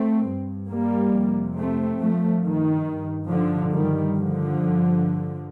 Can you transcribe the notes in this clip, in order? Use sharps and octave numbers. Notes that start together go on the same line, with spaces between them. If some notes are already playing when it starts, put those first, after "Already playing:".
Already playing: A3 C4
G2
G3 A#3
F2 C3
A3 C4
G2 F3 A3
D#3
G2
D3 F3
G2 D#3 G3
D3 F3
G2